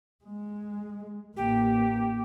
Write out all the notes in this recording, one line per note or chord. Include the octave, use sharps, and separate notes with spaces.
G#3
A1 A#3 G4